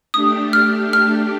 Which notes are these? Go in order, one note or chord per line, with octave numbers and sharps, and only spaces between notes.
A3 D4 G4 D#6
F6
F6